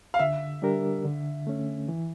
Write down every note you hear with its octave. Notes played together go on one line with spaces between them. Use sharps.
F5
D3 E5
G3 D4 G4 A#4
D3
A3 C#4
E3